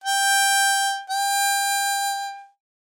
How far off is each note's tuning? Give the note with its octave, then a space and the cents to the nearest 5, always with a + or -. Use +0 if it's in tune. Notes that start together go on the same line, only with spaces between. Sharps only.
G5 +10
G5 +25